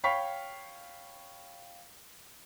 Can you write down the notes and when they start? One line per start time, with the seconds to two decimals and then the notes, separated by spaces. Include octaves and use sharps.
0.03 C#5 F5 G5 B5 C#6 B6